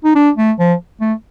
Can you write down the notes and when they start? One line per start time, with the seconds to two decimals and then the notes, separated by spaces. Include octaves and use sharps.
0.04 D#4
0.15 D4
0.37 A3
0.59 F3
1.01 A3